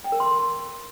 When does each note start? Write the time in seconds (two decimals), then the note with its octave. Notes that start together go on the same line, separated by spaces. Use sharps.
0.04 G5
0.12 A#4
0.20 C6